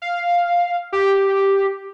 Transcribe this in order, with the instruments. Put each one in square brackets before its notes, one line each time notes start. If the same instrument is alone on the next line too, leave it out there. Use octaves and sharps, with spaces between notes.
[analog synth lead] F5
G4